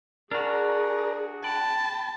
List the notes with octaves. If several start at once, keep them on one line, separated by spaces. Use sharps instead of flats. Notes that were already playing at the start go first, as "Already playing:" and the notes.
D4 F#4 G#4 A#4 D5 A#5
G5 A5 B5